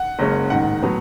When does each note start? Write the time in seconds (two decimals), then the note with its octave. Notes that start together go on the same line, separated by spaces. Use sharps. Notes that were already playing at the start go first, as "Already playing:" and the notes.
Already playing: F#5
0.19 F#1 F#2 C#3 G#3 C#4
0.50 A1 G#2 D#3 F#5
0.82 A2 F#3 B3